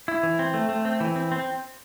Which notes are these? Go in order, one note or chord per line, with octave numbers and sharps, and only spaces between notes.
E4
E3
C4
A3
A3
C4
E3
C4
C4